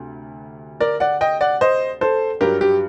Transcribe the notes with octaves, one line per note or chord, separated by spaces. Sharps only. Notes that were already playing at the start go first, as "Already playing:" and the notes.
Already playing: D2 C3
A#4 D5
D5 F#5
D#5 G5
D5 F#5
C5 D#5
A4 C5
G2 F#3 G4 A#4
G4